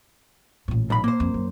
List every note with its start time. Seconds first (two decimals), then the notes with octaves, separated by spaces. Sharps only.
0.68 A1 A#2
0.90 B1 B5
1.04 A#3 C5
1.20 F2
1.34 F#2